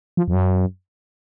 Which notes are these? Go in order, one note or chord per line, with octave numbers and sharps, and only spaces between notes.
F3
F2
F#2